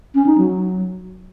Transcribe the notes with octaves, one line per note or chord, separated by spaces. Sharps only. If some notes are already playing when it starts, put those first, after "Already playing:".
C#4
D#4
F#3